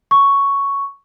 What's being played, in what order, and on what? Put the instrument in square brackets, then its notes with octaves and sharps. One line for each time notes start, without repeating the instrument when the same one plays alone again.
[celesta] C#6